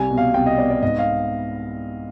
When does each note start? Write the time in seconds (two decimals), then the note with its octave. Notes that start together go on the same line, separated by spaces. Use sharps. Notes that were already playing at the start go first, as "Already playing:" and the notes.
Already playing: C2 G3 G#5
0.10 B2
0.18 F5
0.34 C2 G5
0.46 D#5
0.58 B3 D5
0.70 D5
0.82 G#2 D#5
0.99 F5